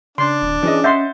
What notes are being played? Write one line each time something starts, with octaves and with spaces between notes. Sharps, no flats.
C#3 D4 C6
D1
E3 C#4 G#4 D#5
D#5 E5 F#5 C6 G6 A6